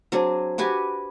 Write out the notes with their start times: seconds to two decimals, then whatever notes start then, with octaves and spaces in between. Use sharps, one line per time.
0.12 F#3 C4 D4 G#4
0.58 F#4 G4 B4 G#5